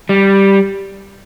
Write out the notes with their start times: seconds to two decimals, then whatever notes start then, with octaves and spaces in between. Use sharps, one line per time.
0.09 G3